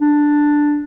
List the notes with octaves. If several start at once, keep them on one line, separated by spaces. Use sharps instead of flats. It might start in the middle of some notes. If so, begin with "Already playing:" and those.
D4